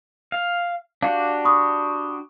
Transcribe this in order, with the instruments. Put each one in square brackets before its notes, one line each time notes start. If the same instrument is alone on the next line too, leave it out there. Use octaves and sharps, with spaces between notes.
[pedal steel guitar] F5
[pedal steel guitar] D4 F#4 G4 [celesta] F5
[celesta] B5 C#6 D#6